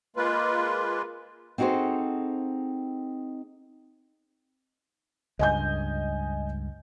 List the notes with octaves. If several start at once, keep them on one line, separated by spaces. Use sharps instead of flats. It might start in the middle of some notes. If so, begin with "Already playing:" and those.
G#3 A#3 F4 B4
C4 D#4 F#4 G#4 A4 C5
C#2 G2 D#5 G#5 G6